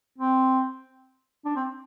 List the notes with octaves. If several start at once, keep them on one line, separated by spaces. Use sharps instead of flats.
C4
D4
C4